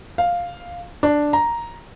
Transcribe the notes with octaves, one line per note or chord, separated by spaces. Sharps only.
F5
D4
A#5